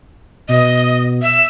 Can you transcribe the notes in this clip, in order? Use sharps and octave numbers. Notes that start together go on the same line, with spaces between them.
B2 D#5
E5